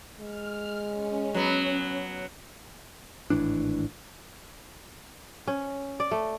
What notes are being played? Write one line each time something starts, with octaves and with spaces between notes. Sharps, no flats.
G#3 F6
C#4
F#3 B3
G#1 A2 E3 D4
C#4
D5
A3